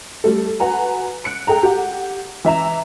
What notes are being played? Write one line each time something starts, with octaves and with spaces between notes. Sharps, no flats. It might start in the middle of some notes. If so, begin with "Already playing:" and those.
G3 A3 A4
F#4 B4 F#5 G#5 A#5
F#6 C#7 D7
G#4 A4 G5 A#5
G4 F#5
E3 E5 A#5 E7